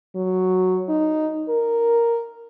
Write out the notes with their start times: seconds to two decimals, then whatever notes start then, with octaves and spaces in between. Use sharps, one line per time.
0.15 F#3
0.88 D#4
1.49 A#4